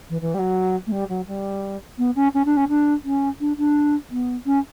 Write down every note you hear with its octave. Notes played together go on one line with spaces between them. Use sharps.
E3
E3
G3
F#3
A3
G3
F#3
G3
B3
C#4
C#4
D4
C#4
D4
C#4
D4
D4
B3
C#4